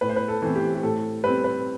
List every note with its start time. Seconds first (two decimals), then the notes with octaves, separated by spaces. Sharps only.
0.01 A2 B4
0.09 C5
0.16 B4
0.28 A4
0.42 E3 A3 C4
0.56 G4
0.75 G4
0.83 A2 A4
1.24 G3 C4 B4
1.44 B4